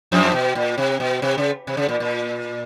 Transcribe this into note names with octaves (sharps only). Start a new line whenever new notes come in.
F2 F3
B2
A#2
C3
B2
C3
C#3
C3
C#3
A#2
A#2